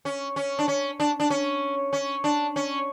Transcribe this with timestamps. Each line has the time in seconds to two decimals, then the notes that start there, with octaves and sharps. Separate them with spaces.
0.05 C#4
0.36 C#4
0.59 D4
0.68 C#4
1.00 D4
1.20 D4
1.30 C#4
1.93 C#4
2.24 D4
2.56 C#4